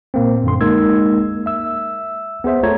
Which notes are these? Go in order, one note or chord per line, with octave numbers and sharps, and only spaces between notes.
A#2 A#3 C4
F#2 D3 C6
G#3 A#3 D#4 A#4 E6 G#6
E5 E6
B3 G#4 C5 E5
A3 F4 A4 C#5 A#5 G#6